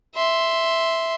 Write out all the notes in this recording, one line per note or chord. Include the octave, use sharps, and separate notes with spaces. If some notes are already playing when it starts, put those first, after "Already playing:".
E5 C6